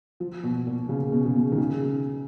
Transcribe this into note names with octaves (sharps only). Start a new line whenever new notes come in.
F3
B2
A#2
C#3
B2
C#3
B2
D#3
C#3